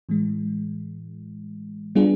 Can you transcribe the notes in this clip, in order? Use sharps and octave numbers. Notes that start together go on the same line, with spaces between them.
A2 E3 G#3
G3 B3 D4 F4 G#4